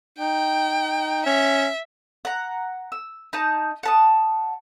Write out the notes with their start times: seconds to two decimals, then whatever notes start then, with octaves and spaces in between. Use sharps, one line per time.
0.19 D#4 G5
1.26 C#4 E5
2.25 F#5 A#5
2.92 E6
3.33 D#4 D#5 A5
3.83 F#5 A5 D#6